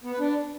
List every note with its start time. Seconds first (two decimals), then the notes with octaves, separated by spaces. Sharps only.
0.04 B3
0.12 B4
0.20 D4